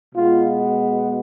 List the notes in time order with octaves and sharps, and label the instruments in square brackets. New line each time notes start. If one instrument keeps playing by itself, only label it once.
[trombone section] B2 G#3 B3 F4